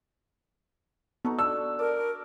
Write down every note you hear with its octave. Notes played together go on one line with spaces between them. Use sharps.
B3 D#4 F#4 A4
D4 A4 E6
A#4 D5